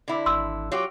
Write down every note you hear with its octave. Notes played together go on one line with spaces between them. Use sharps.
D3 E4
G#1 C6 E6
F#3 F4 G4